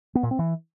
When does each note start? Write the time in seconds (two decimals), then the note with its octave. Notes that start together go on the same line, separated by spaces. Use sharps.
0.15 B3
0.23 A#2
0.31 C4
0.39 E3